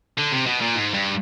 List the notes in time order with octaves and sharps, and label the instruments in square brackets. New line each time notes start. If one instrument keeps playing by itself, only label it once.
[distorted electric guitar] D3
C3
B2
A#2
G#2
G2